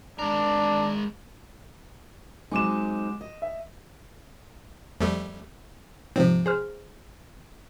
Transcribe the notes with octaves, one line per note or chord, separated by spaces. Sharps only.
G#3 D4 A#4
F#3 G#3 C4 D#4 D6 E7
D#5
E5
F2 G3 A3
G#2 C3 F3 C4
G#4 C5 F6